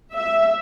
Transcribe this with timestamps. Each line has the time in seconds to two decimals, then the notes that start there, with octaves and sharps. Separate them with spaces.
0.14 E5